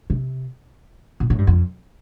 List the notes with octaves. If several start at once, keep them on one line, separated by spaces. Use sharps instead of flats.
C3
A#2
A2
G2
F2